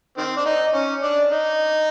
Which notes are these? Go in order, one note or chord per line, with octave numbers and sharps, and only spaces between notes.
D#3 C4
D4
D#4
C#4
D4
D#4